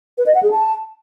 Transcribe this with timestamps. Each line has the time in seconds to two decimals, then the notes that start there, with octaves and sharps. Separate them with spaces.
0.18 B4
0.26 D#5
0.34 F#5
0.43 G#4
0.51 A5